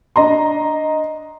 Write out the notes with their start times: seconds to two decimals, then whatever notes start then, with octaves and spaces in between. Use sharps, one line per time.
0.16 D4 D#5 A#5 C6